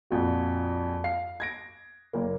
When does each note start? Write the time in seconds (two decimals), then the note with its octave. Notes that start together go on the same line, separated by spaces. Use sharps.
0.10 A#1 F2 F#4
1.04 F5 C7
1.40 G#6 A#6 D7
2.13 F#1 A#3